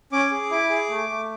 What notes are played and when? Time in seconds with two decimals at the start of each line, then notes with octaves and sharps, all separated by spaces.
0.12 C#4 D6
0.31 G#4
0.51 E4 D6
0.70 G#4
0.89 A3
1.09 A3